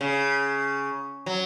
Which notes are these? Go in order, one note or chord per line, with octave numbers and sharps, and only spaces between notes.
C#3
F#3